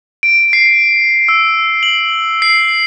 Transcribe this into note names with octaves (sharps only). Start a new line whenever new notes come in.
D7
C7
E6
F#7
C7